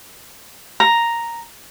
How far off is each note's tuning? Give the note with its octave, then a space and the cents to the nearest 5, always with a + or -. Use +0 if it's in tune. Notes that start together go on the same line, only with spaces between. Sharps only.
A#5 +0